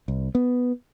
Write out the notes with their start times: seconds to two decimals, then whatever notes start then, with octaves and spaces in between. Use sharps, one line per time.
0.08 C2
0.35 B3